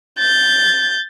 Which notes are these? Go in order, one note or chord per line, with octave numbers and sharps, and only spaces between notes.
G6 A6